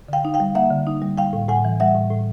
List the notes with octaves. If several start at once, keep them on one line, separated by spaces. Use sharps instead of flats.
D3 F5 G5
D#4
F5 G5
G3
A#3 E5 F#5
D3
D#4
G3
G3 F5 G5
A2
A2 F#5 G#5
E3
G3 E5 F#5
A2
A2